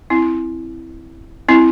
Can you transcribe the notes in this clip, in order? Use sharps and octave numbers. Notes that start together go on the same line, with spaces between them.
C4 E4
C4 E4